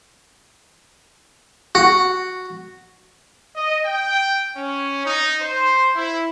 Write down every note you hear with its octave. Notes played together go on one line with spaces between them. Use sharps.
F#4
D#5
G5
C#4
D#4
C5
E4